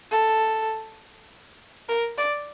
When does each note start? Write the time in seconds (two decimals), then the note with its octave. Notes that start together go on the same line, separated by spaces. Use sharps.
0.11 A4
1.89 A#4
2.18 D5